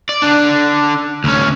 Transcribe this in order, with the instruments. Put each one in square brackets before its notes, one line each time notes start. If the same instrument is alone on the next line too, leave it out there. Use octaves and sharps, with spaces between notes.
[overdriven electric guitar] D5
D3 D4
D2 C#4